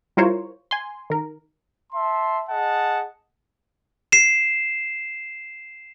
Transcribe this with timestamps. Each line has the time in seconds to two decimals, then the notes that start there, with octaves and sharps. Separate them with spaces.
0.17 G3 E4 F4 A#4 C5 C#5
0.71 G#5 C6
1.10 D#3 A#4
1.93 E5 A5 C6
2.49 G#4 D#5 F#5 A5
4.12 C7 E7